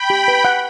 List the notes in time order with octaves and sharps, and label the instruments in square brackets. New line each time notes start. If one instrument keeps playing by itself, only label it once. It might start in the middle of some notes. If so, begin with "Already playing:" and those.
Already playing: [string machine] G5 B5
[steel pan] G4
B4
F#5